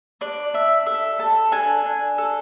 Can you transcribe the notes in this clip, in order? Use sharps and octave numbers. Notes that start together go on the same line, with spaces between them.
D4 D5
D4 E5
A4 E5
A4 A5
D4 G#5
D4
A4